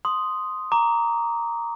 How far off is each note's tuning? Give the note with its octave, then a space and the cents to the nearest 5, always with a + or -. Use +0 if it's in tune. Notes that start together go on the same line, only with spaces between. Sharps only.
C6 +0 D#6 +0
A#5 +0 D6 -20